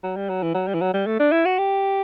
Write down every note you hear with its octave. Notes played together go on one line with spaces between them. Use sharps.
F#3
G3
F#3
E3
F#3
G3
E3
F#3
G3
A3
D4
E4
F#4
G4